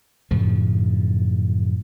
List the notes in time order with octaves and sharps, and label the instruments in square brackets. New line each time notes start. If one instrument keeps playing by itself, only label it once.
[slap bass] F#2 A2 C#3 F3